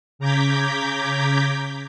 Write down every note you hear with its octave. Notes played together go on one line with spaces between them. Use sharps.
C#3 A#5 D6 G6 G#6 B6